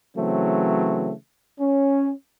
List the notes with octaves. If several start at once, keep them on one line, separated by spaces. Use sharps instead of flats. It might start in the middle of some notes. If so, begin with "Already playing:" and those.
C#3 E3 F#3 A3 C4
C#4